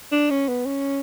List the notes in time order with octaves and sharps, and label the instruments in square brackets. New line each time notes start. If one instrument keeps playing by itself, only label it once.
[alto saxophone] D4
C#4
B3
C#4